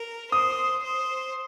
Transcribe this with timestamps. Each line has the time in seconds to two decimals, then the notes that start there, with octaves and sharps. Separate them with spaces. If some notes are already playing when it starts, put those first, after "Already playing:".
Already playing: A#4
0.32 C5 D#6
0.84 C5